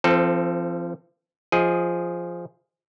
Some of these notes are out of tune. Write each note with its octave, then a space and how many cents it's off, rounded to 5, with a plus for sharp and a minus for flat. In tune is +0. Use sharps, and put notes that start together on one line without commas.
F3 -30 C4 +10 A4 +0
F3 -5 G#4 +0 D#5 +5